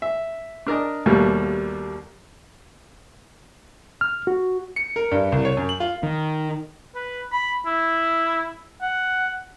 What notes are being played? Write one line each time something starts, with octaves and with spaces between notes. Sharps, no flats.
E5
D4 A#4 D5 D#5
D#2 B2 G3 A3 A#3
F6
F#4
C#7
A#4
G2
C2
C#5
F#2
F#7
F4
D#3
B4
B5
E4
F#5